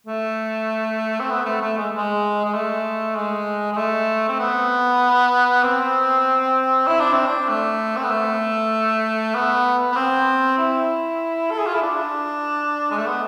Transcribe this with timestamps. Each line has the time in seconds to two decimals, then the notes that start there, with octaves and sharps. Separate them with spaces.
0.07 A3
1.20 C4
1.30 B3
1.45 A3
1.61 A3
1.77 G#3
1.97 G#3
2.45 G#3
2.54 A3
3.15 G#3
3.73 G#3
3.77 A3
4.28 C4
4.39 B3
5.64 C4
6.87 E4
7.00 D4
7.13 C4
7.27 D4
7.49 A3
7.96 C4
8.03 B3
8.11 A3
9.35 B3
9.92 B3
9.96 C4
10.58 E4
11.51 A4
11.59 G#4
11.66 F4
11.74 E4
11.82 D4
12.91 G#3
12.98 A3
13.06 B3